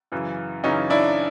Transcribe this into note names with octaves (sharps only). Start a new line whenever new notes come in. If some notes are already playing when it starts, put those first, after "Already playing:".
F#2 C#3 E3
F#2 C#3 E3 C#4 D#4
D4 E4